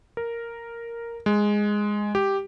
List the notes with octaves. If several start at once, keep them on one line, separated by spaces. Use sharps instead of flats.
A#4
G#3
G4